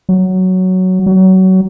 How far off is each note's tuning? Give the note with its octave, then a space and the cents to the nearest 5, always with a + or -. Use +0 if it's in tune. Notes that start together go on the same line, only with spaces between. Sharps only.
F#3 +5
F#3 +25